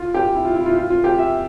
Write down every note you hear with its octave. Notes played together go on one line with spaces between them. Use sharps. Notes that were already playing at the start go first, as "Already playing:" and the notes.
Already playing: F4
G4
E4
F4
E4
F4
F4
F4
G4
E5